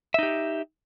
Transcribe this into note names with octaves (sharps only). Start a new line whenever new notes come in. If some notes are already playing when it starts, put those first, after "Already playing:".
D#4 G4 E5